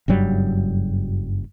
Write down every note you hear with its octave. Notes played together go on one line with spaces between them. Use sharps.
F#1 G2 F#3 G3